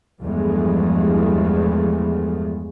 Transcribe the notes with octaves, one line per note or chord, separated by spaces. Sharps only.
E2 G2 E3 F3 G#3 A3